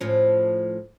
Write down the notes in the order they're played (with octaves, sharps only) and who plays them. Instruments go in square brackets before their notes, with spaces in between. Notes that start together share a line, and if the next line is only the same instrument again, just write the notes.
[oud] A2 F3 C#4